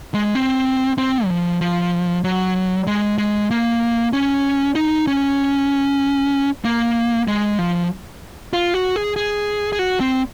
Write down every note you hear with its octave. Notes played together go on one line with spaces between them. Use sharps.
G#3
C4
C4
F#3
F3
F3
F#3
G#3
G#3
A#3
C#4
D#4
C#4
A#3
G#3
F3
F4
F#4
G#4
G#4
G#4
F#4
C4